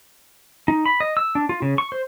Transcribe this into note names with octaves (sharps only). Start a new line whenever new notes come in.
D#4
B5
D#5
E6
D4
F4
C#3
C#6
C5